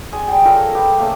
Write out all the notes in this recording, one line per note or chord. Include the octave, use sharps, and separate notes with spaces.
G#4 D5 G#5 C6
G3 G5
F4 A4 A#4 C#5
G4 B4
C#3 A3 A#3